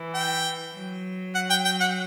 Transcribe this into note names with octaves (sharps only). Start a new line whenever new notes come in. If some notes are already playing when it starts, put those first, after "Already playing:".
Already playing: E3
G5
F#3
F#5
G5
G5
F#5